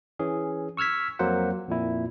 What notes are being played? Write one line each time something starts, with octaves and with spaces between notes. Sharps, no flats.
E3 C#4 G#4
C#6 E6 F6 G#6 B6
F2 F#3 A#3 C5 F#5
F2 A#2 E4